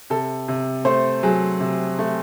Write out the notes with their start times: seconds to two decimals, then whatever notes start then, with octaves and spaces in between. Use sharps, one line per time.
0.10 C3 A4
0.48 C3
0.85 A3 C5
1.23 F#3 G#4
1.60 C3
1.99 A3